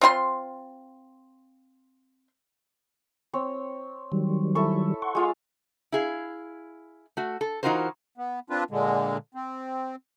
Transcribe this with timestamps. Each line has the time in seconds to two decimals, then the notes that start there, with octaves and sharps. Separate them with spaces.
0.01 C4 F4 F#5 C6
3.33 C4 C#5
4.12 D#3 F#3 G3
4.55 E4 A4 C#6
5.02 F#5 C6 C#6
5.15 G#3 F4 F5
5.92 E4 G#4 F5
7.17 A3 F#4
7.41 A4
7.63 E3 D#4 F4 F#4 A#4 C5
8.18 B3
8.50 C4 D4 F4 B4
8.71 A#2 D3 G#3
9.35 C4